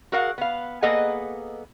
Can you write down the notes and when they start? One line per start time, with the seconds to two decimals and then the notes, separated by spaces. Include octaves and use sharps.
0.12 F#4 G#4 A#4 F5 F#5
0.38 B3 F5
0.82 A#3 B3 G#4 A4 D#5 F#5